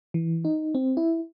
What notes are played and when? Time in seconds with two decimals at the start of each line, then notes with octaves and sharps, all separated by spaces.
0.14 E3
0.45 D#4
0.75 C4
0.97 E4